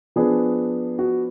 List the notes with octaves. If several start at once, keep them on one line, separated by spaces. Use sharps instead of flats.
F3 B3 D4 G#4
F#4